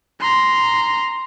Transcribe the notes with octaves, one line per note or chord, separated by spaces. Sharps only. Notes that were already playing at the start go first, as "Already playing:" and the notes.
A#5 C6